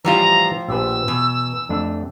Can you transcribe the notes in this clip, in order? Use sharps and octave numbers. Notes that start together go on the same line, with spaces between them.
A2 E3 F3 G3 E4 F4 A#5
A#1 G4 B4 E6
E2 B2
F2 A3 D4